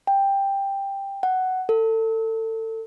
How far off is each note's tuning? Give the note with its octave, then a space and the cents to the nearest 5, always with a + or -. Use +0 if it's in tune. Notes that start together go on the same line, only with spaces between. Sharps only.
G5 +10
F#5 +10
A4 +25